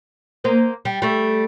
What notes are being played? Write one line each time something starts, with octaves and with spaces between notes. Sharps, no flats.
A#3 C5 D#5
G3
G3 A3